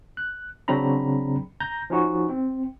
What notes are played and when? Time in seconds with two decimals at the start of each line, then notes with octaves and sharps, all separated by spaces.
0.17 F#6
0.68 C#3 F#3 C4 D4 A#5 B5
1.60 A#5 G6 A#6
1.90 F3 C#4 D#4 F#4
2.30 C4